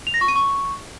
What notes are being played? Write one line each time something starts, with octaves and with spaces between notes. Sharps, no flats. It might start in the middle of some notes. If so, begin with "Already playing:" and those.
F7
A#6
C#6
D#7
C#6